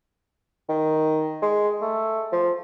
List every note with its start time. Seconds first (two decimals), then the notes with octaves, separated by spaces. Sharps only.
0.69 D#3
1.42 G#3
1.81 A3
2.32 F3